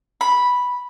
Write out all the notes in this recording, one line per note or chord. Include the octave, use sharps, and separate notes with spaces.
B5